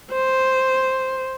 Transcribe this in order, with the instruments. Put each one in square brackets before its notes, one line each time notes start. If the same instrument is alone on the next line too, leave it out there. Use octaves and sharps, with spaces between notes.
[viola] C5